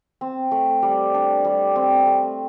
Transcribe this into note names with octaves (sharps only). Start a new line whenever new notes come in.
C4
A3
G3
D4
G3
C4
A3